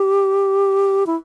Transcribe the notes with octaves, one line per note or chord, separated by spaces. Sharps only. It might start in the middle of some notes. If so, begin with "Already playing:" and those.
Already playing: G4
E4